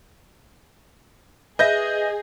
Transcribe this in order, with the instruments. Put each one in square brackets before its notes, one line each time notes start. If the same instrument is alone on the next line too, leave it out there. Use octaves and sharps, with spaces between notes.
[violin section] G#4 [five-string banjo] B4 E5 [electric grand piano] D#5 G6 A#6